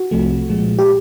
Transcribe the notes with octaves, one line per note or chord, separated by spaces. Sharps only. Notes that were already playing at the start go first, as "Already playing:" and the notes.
Already playing: F#4
C2 C3 F3 A3
A#2 F3 G#3
G4